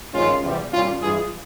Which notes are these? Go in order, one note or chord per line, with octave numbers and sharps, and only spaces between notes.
G#1 G2 F3 G#3 C#4 F4
E2 C3 G3
C2 A#2 G3 C#4 F4
G2 E3 G#3 F4 G#4